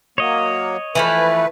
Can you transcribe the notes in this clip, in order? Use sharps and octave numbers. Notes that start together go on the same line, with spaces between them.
F#3 A#3 C#5 D#5
E3 F3 A3 B4